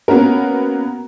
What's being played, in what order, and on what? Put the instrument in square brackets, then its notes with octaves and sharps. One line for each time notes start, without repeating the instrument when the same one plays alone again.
[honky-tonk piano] A#3 B3 C#4 F#4 A#4